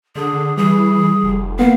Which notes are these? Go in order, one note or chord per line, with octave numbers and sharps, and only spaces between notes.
D3 G#4
D3
E3 G3 G#4
F1
A#3 B3 F5